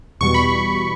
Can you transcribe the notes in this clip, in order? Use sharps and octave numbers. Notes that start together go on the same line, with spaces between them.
E2 B2 G3 C#6
B5